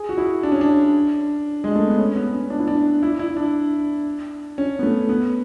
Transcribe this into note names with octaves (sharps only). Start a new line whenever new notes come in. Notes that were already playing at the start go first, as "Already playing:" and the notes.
Already playing: G#4
F#4
E4
D4
C#4
D4
G#3
A3
B3
C#4
B3
C#4
D4
E4
D4
E4
E4
D4
C#4
B3
A3
B3